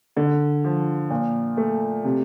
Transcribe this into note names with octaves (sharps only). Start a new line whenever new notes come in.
D3
F3
A#2
A3
C3